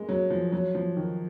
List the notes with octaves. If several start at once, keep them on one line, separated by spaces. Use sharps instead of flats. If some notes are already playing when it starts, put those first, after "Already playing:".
Already playing: G#3 A#3
F#3
F3
F#3
F3
D#3